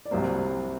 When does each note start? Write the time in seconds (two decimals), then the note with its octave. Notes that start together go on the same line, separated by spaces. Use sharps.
0.05 D5
0.11 C2 C3 F#3 A#3 C5